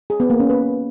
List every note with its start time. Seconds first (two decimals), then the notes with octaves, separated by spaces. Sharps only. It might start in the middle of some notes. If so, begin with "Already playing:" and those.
0.10 G#4
0.20 B3
0.30 A#3
0.40 C#4
0.50 B4